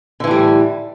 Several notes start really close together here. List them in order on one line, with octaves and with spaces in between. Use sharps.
D3 E3 A2 G3